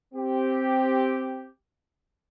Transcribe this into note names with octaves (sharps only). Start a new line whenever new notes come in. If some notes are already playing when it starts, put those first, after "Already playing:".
C4 G4